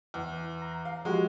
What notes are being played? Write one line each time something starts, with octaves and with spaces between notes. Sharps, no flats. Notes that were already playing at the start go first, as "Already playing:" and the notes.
E2
A#5
F5
F3 G#3 F#4 G4